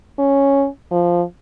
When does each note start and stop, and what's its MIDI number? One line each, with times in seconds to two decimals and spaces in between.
0.19 0.67 61
0.91 1.22 53